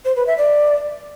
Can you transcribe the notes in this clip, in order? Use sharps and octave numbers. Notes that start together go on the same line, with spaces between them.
C5
B4
E5
D5